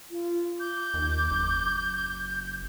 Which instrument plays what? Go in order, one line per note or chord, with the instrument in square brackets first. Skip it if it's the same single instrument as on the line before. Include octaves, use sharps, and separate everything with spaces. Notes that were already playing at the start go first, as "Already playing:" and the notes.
[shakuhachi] F4
[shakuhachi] D6 [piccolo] G6
[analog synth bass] D#2
F#1